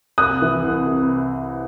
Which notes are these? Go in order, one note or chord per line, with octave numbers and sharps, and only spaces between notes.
C2 D#6 F#6
E3
C2
C3